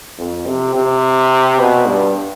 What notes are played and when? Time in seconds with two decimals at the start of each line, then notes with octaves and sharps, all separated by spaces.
0.18 F2
0.46 C3
0.75 C3
1.59 B2
1.87 G2